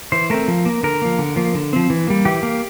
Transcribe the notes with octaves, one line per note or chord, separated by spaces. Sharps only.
E3 C5
A3 C4 A#4
F3
A#3
D3 A#4
F3 A#3
D3
F3 A#3
D3
F3 C4
E3
G3 A#3
E3 G4
A#3